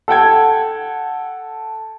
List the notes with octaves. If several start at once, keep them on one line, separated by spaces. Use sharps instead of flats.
A4 F#5 G5 G#6